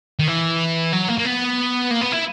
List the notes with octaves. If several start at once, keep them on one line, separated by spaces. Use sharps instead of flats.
D#3
E3
F#3
A#3
A#3
B3
A#3
B3
E4